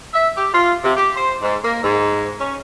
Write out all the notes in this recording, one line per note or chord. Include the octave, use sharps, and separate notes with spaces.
E5
G4
F4
C3
G4
C5
G#2
A#3
G#2
C#4